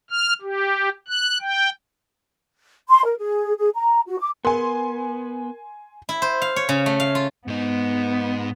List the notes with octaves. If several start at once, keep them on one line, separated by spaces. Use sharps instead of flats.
F6
G4
F#6
G5
C6
A#4
G#4
G#4
A#5
F#4
D6
B3 A#4 G#5 C6
E4
C5
F5
C#5
C#3
A3
F5
F4
G#2 B3 D#4